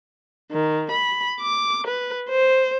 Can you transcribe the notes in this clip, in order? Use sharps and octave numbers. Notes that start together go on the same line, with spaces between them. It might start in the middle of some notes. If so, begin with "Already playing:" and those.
D#3
B5
D6
B4
C5